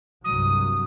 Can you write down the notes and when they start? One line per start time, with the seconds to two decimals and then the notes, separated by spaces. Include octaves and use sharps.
0.24 C2 G2 F#3 D#6